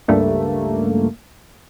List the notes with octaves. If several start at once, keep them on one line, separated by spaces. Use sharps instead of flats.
C#2 G2 A3 A#3